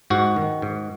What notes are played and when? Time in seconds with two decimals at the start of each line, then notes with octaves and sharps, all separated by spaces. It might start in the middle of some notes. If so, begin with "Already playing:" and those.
0.10 G#2 F#4
0.36 D#3
0.62 G#2